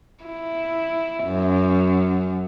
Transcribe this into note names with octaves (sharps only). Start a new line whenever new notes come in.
E4
F#2